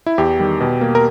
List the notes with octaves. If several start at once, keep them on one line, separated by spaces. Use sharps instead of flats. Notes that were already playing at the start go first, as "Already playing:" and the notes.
E4
E2 G4
D#3 G3
B2
A#3
A#4